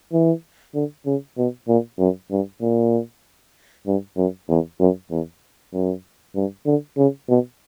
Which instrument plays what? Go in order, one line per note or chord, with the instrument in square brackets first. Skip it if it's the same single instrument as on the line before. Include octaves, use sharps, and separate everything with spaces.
[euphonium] E3
D3
C#3
B2
A#2
F#2
G2
A#2
G2
F#2
E2
F#2
E2
F#2
G2
D3
C#3
B2